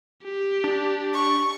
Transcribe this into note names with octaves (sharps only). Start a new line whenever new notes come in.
G4
D4
C#6